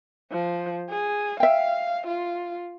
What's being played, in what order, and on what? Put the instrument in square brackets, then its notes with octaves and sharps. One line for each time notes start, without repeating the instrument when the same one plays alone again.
[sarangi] F3
G#4
[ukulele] E5 G5 [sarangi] F5
[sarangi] F4